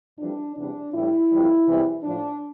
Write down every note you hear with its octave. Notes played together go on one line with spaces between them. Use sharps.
F2 E3 G3 D4
E2 C3 G3 D4
A2 E3 G3 E4
F2 E3 G3
E2 C3 E3 G3
A2 F3 D4